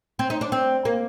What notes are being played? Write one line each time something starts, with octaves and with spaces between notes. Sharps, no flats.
C4
D#4
D4
C4
A#3